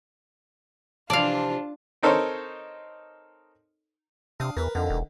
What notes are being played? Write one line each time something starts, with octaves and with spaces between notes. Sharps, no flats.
C3 E3 F3 D4 F4 D5 F5 A5
C4 D#4 A4 A#4 C5 C#5
C3 D4 F5 D#6
E2 A#4 B4
F2 D3 D#3
E1